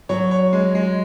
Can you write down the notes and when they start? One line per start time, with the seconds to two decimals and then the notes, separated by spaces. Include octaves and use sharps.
0.09 F#3 C#5
0.31 C#5
0.53 G#3
0.75 G#3